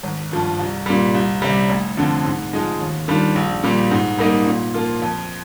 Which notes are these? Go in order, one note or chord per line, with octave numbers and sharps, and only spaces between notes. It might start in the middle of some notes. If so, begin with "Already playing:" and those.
G#1
G2 F3
C2
A#2 G3
C2
C3 G3
F1
F2 D3 F3 C4
G#2
F3 G#3 D#4
D#2
D#3 G3 D4 F4
A#1
A#2 G3
G#2
G3 A#3 D#4
A#2
F3 A#3 F4
F2